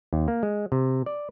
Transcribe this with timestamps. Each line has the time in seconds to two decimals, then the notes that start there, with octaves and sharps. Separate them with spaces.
0.13 D#2
0.28 A#3
0.43 G#3
0.72 C3
1.06 D5